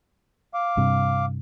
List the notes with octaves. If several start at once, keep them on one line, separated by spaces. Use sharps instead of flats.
F5 D6
G2 C3